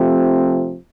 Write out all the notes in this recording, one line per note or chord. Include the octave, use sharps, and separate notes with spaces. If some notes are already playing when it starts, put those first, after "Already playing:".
Already playing: C3 F3 A3 C4